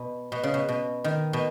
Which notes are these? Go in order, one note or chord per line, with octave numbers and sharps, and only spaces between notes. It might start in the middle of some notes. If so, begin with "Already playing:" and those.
Already playing: B2
B2
C#3
B2
B2
D#3
B2